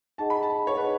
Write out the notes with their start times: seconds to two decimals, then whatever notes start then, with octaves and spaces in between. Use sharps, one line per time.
0.18 D#4 G#4 D#5 F#5 A5
0.30 B5
0.43 A5
0.67 C#5
0.77 D#4 G#4 B4 D#5 F#5